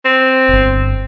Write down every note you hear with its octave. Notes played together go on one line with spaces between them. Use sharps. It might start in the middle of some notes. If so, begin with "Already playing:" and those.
C4
D1 G1